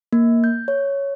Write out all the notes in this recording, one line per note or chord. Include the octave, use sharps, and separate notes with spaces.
A#3
G6
C#5